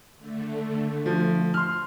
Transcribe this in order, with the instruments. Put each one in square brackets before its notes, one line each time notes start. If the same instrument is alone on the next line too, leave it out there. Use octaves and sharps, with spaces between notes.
[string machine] D3 A3
[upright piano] F3
C6 F6